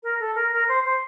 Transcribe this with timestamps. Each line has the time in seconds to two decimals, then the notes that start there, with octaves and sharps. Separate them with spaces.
0.03 A#4
0.20 A4
0.35 A#4
0.52 A#4
0.68 C5
0.84 C5